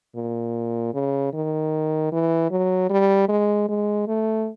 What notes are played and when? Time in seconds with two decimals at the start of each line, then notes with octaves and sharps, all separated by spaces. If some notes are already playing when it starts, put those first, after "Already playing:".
0.16 A#2
0.94 C#3
1.33 D#3
2.12 E3
2.51 F#3
2.90 G3
3.29 G#3
3.69 G#3
4.08 A3